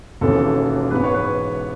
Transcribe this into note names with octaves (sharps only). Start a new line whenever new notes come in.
E1 D#2 C#3 E3 A4
G#2 E3 G#3 B3 B4
C#5
B4